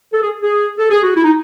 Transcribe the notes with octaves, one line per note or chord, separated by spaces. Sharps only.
A4
G#4
G#4
A4
G#4
F#4
E4
D#4